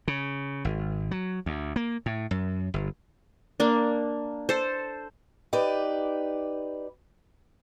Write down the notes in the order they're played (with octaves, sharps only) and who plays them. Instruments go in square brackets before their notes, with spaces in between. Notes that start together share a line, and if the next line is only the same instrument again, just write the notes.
[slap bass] C#3
G#1
F#3
D2
A#3
A2
F#2
G1
[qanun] A#3 D4
A4 C5
[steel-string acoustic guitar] D#4 G4 B4 D5